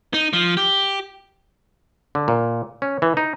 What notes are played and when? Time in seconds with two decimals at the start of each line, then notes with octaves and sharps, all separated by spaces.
0.14 D#4
0.33 F3
0.57 G4
2.15 D3
2.28 A#2
2.82 C#4
3.02 E3
3.17 D#4